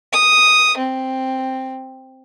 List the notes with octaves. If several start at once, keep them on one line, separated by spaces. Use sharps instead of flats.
D#6
C4